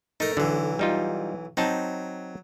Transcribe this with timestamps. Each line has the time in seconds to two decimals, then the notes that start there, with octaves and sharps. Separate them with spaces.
0.20 A3 D#4 A#4
0.37 B1 D3 E3
0.79 G3 D#4 F4
1.57 F#3 C4 D#4 A5